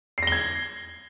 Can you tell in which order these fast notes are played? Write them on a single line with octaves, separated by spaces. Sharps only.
C7 A#6 G7 G#6